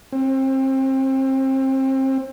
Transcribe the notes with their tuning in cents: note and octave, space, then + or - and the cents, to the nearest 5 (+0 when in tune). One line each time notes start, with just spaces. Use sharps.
C4 +30